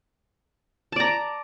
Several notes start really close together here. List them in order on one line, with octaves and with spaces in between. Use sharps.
A5 D5 A#5